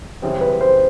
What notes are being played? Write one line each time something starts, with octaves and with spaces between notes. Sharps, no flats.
F#2 C#3 E3 G3 C4
B4
C5